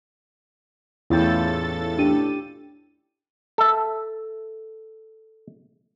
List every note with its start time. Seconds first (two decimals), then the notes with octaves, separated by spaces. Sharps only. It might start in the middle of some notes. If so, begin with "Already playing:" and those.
1.10 E2 A2 C#4 E4 F4 A4 G5 A6
1.99 D4 G4 D#7
3.58 A4 E5